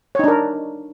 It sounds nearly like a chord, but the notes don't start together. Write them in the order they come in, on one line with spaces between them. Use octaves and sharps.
C#5 D#4 D4 A#4